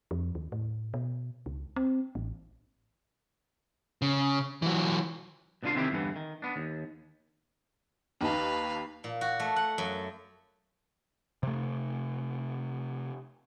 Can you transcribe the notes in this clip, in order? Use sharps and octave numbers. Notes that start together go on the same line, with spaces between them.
F2
D#2
A2
B2
C#2
C4
A1
C#3
E3 F#3
B2 D3 D4 F4 C6
C3 D#3 E3 C4 E4 G4
E2 G2 D3 E3
D#3
B3 D4
D#2
D#2 D#4 B4 F5 A5
A#2
F#4
A3
F#5
F#2
C3 A3